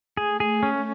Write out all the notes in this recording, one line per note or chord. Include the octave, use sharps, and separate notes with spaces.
A3 G#4
G#4
C#4